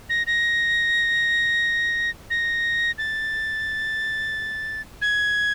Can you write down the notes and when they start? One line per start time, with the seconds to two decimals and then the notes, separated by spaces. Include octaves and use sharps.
0.10 A#6
0.27 A#6
2.30 A#6
2.98 A6
5.02 G#6